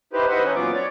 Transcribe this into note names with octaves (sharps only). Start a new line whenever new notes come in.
D#4 E4 G4 B4 C5
B4 C5 D#5 E5 F#5
E3 C#4 D#4
A#2 F#3 B3 F4 D6
C#5 D5